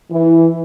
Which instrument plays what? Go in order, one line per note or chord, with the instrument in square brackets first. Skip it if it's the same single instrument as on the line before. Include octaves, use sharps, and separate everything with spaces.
[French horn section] E3